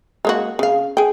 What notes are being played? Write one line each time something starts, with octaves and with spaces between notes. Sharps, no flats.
G#3 A#3 F#4
C#3 F5
G#4 G5